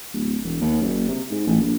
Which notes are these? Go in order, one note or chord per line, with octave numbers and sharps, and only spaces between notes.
D1
E1
D#2
F#1
C3
G#2
A1
A#1